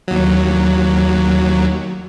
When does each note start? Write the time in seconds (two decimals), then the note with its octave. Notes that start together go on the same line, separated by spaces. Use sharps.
0.08 D#2 F#3